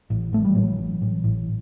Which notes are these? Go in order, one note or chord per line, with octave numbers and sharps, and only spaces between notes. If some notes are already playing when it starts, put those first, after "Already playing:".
A1
A1 A3
G3
A1 F#3
A1
A1
A1